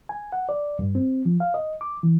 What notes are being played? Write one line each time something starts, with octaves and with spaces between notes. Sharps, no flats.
G#5
F#5
D5
G2
C4
F3
F5
D#5
D6
E3